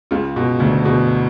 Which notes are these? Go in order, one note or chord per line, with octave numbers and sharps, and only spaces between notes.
C#2 C#3
B2
D2 D3
B2